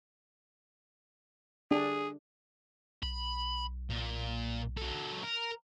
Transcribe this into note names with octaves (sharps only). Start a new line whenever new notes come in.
D4 G#4
B1 B5
A#2
F#3 A4
A#4